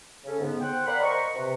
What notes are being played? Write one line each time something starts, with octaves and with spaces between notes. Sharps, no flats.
C#3 C#4 A4
G#2 D3 B3
C5 F#5 G5
A#4 D5 F5 F#5 B5
C5 D#5 A#5 C#6
C3 B4